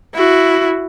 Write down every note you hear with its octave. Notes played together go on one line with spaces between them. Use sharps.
E4 F#4